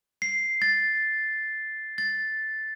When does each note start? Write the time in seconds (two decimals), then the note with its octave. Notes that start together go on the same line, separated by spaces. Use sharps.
0.22 C7
0.62 A6
1.98 A6